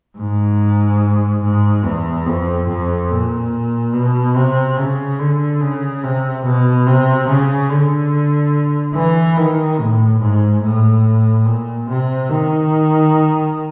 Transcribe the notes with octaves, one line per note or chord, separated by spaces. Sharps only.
G#2
G#2
E2
F2
F2
A#2
B2
C3
C#3
D3
C#3
C3
B2
C3
C#3
D3
E3
D#3
A2
G#2
A2
A#2
C3
D#3